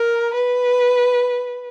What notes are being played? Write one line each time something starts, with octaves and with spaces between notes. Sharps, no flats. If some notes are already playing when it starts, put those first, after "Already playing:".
Already playing: A#4
B4